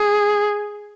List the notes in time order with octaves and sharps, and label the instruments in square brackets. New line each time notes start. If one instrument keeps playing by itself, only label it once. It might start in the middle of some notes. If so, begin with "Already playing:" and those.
Already playing: [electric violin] G#4